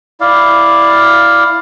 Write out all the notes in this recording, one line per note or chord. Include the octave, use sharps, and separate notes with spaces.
E4 D5 F5